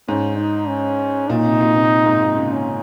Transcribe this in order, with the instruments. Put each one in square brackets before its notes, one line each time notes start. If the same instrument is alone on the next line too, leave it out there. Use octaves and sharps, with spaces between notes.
[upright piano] G#2 [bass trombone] C#4
[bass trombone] D#4
C#4
[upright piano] A#2 [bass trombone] D#4
[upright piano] C3
A#2
C3
G#2
A#2
C#3
[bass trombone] C#4